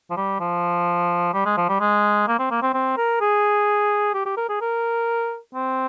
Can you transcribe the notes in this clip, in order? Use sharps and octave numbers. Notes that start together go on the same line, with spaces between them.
F3
G3
F3
G3
G#3
F3
G3
G#3
A#3
C4
A#3
C4
C4
A#4
G#4
G4
G4
A#4
G#4
A#4
C4